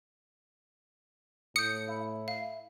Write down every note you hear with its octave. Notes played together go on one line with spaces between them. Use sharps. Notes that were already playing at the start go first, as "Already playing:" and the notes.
A2 D#6 G6 C#7
E4
F5